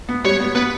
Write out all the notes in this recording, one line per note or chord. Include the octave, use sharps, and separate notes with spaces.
B3
G3 C#5
B3
B3 B4